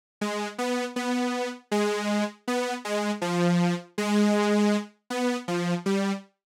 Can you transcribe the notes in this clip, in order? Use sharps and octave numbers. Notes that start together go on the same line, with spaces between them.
G#3
B3
B3
G#3
B3
G#3
F3
G#3
B3
F3
G3